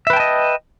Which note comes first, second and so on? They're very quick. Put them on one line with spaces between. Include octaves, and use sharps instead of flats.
E5 B4 G5 A5 D#5